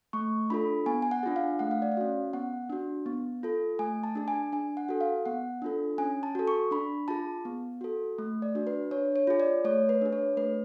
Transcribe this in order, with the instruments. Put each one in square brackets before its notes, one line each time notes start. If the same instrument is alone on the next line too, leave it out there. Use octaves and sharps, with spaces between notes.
[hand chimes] A3 C#6
D4 F4 A4 B5
B3 G#5
G#5
F#5
D4 F4 G#4
F5
A3 F#5
F5
D5
F5
C#4 F#4
B3 F#5
D4 F#4
B3
F4 A4
A3 G#5
A5
D4 G#4
G#5
D4 G#5
F#5
F#4 A4
F5
B3 F#5
D4 F4 A4
C#4 G#5
A5
F#4 A4
C#6
D4 B5
F4 G#4 A5
B3
F#4 A4
A3
D5
D4 F#4
B4
D4 C#5
C#5
F4 G#4
D5
A3 C#5
B4
D4 G#4
C#5
A3 B4